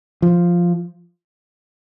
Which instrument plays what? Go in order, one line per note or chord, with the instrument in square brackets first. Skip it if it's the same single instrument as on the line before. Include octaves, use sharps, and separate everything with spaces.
[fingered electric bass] F3